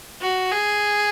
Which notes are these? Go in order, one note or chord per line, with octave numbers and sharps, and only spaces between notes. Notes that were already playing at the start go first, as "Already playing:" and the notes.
F#4
G#4